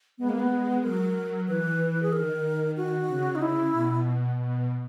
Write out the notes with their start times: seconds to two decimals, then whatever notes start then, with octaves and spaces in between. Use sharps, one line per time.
0.18 G#3 B3
0.29 A#3
0.39 B3
0.50 G#3
0.83 F#3 A#4
1.15 F#3
1.47 E3 B4
2.02 G#4
2.12 D#3 A#4
2.77 F#4
3.09 C#3
3.35 D#4
3.42 E4
3.73 B2
4.38 B2